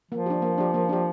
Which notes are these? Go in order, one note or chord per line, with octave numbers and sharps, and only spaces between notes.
F3 A#3
D4 G4
A#3
D4 G4
A#3
D4 G4